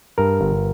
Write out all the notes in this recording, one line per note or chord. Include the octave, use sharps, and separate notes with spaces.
G2 A#4
G1